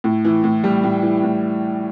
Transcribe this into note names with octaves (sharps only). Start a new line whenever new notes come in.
A2
E3
A2
G3
A2
E3
A2